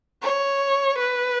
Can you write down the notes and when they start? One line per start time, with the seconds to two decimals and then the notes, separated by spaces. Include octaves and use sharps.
0.22 C#5
0.98 B4